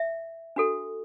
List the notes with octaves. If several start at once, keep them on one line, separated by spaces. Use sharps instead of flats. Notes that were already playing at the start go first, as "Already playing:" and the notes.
Already playing: E5
D4 F#4 A4